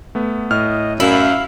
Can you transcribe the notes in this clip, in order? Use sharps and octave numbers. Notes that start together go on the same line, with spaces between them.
A3 B3
A2 D#5 F6
F#2 E4 F5